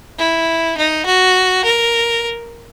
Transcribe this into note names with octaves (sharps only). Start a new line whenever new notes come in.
E4
D#4
F#4
A#4